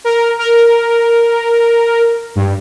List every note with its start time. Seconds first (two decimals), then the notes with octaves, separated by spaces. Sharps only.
0.04 A#4
0.39 A#4
2.36 G2